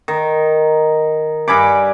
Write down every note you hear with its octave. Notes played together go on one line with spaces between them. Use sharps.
D#3
G2 G#5 B5 D6